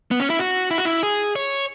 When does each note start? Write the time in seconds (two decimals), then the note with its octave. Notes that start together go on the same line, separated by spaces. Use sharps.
0.11 B3
0.20 C#4
0.30 E4
0.39 F#4
0.71 E4
0.78 F#4
0.85 E4
1.03 G#4
1.36 C#5